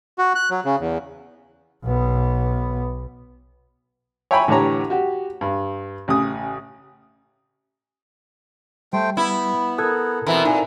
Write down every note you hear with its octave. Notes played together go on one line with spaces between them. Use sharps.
F#4
F#6
F#3
C#3
E2
B1 B3
C#5 E5 G5 G#5 A#5 B5
A2 D3 E3 G4 C#5 A#5
F#4 G4
G2
A1 C#3 D#6
G3 A3 C5 G5
B3 E4
A4 A#4 D#6 F#6 G#6
B2 E3 C4 E4 A#5 D#6
A#2 D#4 G#5